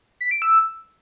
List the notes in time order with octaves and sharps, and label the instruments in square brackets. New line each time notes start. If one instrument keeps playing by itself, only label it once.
[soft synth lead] B6
D7
E6